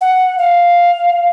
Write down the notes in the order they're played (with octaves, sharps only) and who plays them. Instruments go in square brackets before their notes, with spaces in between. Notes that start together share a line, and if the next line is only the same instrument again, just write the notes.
[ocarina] F#5
F5